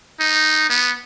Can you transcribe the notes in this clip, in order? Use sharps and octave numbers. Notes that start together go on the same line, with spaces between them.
D#4
B3